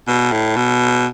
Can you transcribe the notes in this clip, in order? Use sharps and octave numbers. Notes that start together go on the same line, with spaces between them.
B2
A2
B2